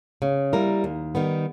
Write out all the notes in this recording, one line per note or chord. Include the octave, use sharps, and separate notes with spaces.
C#3
G3 A#3 E4 A#4
D#2
D#3 G3 B3